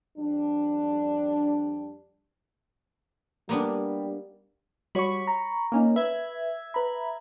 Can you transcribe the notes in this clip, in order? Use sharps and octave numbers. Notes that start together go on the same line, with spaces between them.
F2 G3 D4
G3 A#3 B3 D4
G3 F#4 C#5 B5 C#6
A#5
A#3 C#4 D#4
B4 E5 G#6
B4 A#5 B5